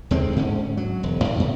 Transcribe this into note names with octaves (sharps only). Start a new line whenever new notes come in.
D#2 D3 G#3 C4
G#2 D3 C#4
F#3
E1
F#2 A2
F#2 B2